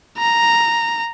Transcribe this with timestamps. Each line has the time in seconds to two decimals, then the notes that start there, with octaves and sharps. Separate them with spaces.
0.18 A#5